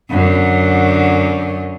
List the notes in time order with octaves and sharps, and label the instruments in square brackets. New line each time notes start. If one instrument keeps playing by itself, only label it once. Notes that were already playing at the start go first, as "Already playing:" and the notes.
[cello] F#2 D3